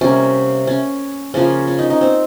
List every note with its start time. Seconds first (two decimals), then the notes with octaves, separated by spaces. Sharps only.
0.01 C3 G3 A#3 C#4
0.67 C#4
1.34 C#3 F3 A#3 C#4
1.68 C#4
1.79 D#4
1.90 D#4
2.01 C4